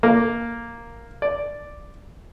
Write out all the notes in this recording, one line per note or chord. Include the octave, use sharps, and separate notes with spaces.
A#3
D5